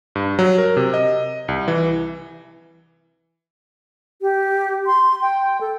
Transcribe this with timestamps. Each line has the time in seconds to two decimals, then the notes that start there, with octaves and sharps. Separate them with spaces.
0.15 G2
0.39 F#3
0.58 A#4
0.77 C3
0.94 D#5
1.48 C2
1.68 E3
4.22 G4
4.86 C6
5.22 G5
5.61 A4